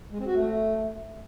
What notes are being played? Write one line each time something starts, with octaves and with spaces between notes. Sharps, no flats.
G#3
C4
F#4
A3